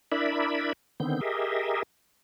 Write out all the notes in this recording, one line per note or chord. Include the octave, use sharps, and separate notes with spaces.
D4 E4 A#4 D5 E5 B5
D3 D#3 B3 C4 G6
G4 G#4 A#4 D#5 E5